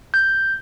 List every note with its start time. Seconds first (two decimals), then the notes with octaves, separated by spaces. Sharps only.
0.14 G6